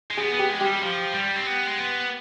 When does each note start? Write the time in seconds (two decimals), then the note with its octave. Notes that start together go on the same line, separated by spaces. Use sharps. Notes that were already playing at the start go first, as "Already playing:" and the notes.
0.10 G#3
0.17 B3 G#4
0.34 B3 G4
0.49 G#3
0.61 G4
0.66 G3
0.82 F3
1.14 G3
1.36 C4
1.47 B3
1.67 G#3
1.79 B3